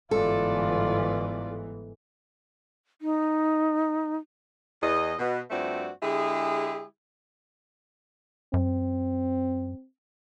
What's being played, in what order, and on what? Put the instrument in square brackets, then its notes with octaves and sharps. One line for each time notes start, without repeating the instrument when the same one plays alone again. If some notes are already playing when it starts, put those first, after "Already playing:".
[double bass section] G1 G#2 E3 [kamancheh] F4 D5 [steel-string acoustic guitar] A4
[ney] D#4
[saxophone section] E2 D#5
B2
G2 F3 A3 C4 F#4 D5
D3 G#3 E4 G4 G#4
[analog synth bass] F#2 [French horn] C4